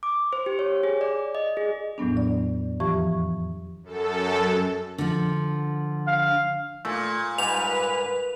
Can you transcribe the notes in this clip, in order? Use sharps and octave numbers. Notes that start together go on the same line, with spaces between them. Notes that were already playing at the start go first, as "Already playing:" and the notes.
D6
C5
G4
C#5
G#4
D5
D#5
G#4
E2 A2 F#3 B3 D4
D5
F2 E3 F3 G4 C#6
F#2 A4
D3 F3
F5
A#2 A3
G#2 G3 B4 F7